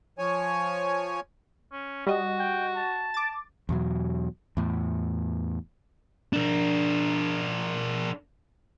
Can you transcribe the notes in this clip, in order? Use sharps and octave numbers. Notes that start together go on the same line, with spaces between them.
F3 C#5 G#5
C#4
G3 F#4 D#5
G5
A5
D6 A6
E2 B2 F#3
E2 A2
D4 A#4